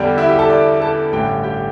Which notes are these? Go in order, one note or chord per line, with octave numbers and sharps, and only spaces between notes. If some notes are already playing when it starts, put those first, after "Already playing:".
Already playing: E2 D3 G3 D4 G4 G5
E4 E5
G4 G5
A4 A5
D5 D6
A4 A5
A1 G2 D3 G4 G5
G4 G5